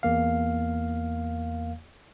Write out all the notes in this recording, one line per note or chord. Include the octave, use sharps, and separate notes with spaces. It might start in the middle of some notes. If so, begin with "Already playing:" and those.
E2 A#3 F5